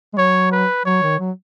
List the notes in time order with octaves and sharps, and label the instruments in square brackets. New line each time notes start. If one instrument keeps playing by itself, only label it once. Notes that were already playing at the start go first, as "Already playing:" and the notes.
[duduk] G#3
[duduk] F#3 [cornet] C#5
[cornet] B4
[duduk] F#3 [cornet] C#5
[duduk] D#3
F#3